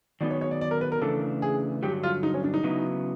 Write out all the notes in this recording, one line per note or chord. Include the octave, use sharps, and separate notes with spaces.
D#3 F#3 B3 D#4 G#4 D5
C#5
C#5
D5
D5
A#4
B4
A#4
C#3 E3 A3 D4 A4
G#4
G2 D3 F#3 G4
F4
D#4
C#4
D4
D#4
C#3 F#3 B3 E4